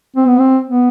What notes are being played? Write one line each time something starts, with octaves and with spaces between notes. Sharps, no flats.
C4
B3
C4
B3